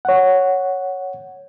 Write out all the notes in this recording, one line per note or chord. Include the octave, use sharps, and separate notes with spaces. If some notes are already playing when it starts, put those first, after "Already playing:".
C#5 F#5